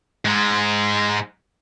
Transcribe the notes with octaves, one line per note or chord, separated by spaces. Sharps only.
G#2 G#3